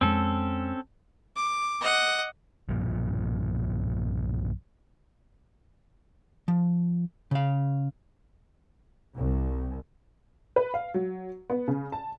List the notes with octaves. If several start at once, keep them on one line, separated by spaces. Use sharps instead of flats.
F2 G#3 C4 C#4 A4
D6
D#5 F#5
B1 G2 A#2 F3
F3
C#3 F5
C2
B4
F5
F#3
B3
C#3
A5